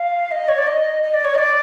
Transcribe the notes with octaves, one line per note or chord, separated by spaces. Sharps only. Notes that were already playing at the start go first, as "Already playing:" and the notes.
Already playing: F5
D#5
C#5
D5
D#5
D#5
D5
C#5
D#5
D5